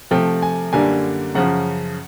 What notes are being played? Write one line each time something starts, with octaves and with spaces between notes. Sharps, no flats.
C3 F3 A3 G5
G#5
F#2 D3 G3 A#3 D4 G#5
F#2 C#3 F3 F#5